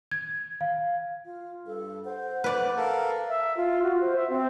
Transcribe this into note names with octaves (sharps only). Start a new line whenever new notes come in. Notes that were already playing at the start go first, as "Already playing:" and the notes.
G#6
F5
F4
G2 A4
C5 F#5
B4 D5
A4 A#4 F5
E5
F4
F#4
C5
E5
C4